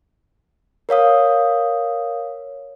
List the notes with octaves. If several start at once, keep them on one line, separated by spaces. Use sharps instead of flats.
A#4 C#5 F5 D#6